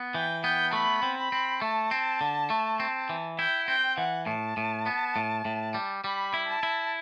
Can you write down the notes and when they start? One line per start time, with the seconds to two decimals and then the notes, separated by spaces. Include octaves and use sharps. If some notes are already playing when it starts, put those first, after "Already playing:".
Already playing: B3
0.14 E3 G5
0.44 B3 G5
0.73 A3 B5
1.03 C4
1.18 B5
1.32 C4
1.62 A3 A5
1.91 C4
2.21 D3
2.50 A3
2.80 C4
3.09 E3
3.39 E4 G5
3.68 C4 G5
3.98 E3 F#5
4.27 A2 A5
4.57 A2
4.86 B3
5.16 A2
5.45 A2
5.74 G3
6.04 G3 B5
6.34 E4
6.48 A5
6.63 E4